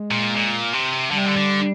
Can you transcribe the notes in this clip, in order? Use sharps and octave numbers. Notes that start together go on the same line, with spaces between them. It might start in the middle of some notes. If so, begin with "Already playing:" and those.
Already playing: G#3
A#2
A#2
C3
D3 G3
C3
D3
D3